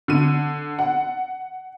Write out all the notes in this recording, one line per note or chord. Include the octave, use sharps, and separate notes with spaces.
D3 D#7
F#5